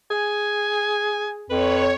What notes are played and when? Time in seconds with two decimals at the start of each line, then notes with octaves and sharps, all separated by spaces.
0.11 G#4 G#5
1.50 F2 B4 C#5